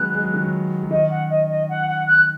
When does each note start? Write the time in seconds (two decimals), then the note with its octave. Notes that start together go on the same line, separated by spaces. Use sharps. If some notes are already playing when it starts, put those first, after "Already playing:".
Already playing: D#3 F#3 G#3 B3 F#6
0.13 G#3
0.23 F#3
0.34 D#3
0.43 F#3
0.83 F#3
0.90 D#3 D#5
1.10 F#5
1.30 D#5
1.49 D#5
1.69 F#5
1.88 F#5
2.07 F#6